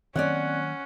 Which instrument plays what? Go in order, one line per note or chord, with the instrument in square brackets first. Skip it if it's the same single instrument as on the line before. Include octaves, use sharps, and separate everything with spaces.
[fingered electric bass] D#3 F#3 A#3 [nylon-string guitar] C4 C#5 D5 [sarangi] C#4 [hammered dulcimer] F#5